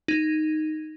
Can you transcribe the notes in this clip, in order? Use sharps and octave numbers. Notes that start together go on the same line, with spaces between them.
D#4